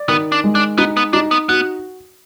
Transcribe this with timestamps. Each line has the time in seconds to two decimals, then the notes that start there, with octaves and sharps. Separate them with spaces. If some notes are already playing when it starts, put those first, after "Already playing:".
Already playing: D5
0.08 D#3 B3
0.32 D4
0.44 G#3
0.55 D4
0.78 B3 D#4
0.97 B3
1.13 D4 D#4
1.31 B3
1.49 B3 F#4